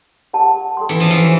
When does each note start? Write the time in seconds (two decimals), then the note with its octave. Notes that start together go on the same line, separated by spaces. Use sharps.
0.33 G4 A#4 D5 F#5 A5
0.77 A4 D5 G5 C6
0.89 E3
1.00 F3
1.11 E3
1.23 D4 G4 C5